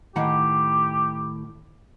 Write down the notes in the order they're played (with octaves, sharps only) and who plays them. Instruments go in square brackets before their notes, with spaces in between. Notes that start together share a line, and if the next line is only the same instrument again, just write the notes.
[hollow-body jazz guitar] A2 D#3 F#5 [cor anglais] G4